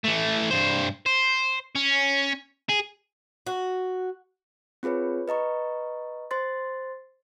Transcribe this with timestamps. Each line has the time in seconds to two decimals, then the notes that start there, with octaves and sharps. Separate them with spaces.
0.05 E3 A3
0.50 G2 C5
1.06 C5
1.75 C#4
2.69 G#4
3.47 F#4
4.83 C4 F4 G#4 B4 C#5
5.28 B4 D#5 A#5 C#6
6.31 C5 C6 A6